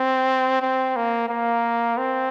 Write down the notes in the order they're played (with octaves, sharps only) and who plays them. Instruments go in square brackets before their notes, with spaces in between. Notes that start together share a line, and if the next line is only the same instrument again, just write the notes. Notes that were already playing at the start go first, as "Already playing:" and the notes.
Already playing: [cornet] C4
C4
A#3
A#3
C4